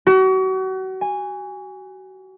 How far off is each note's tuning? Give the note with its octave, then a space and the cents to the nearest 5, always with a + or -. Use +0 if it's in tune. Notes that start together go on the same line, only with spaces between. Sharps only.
F#4 +35
G#5 -15